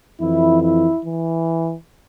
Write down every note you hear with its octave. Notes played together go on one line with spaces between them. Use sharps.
F2 E3 E4
E4
E3